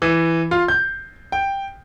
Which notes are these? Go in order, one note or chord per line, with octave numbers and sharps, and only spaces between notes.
E3
F4
G6
G5